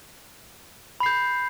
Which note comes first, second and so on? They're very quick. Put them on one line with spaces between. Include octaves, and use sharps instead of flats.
B5 C7 G6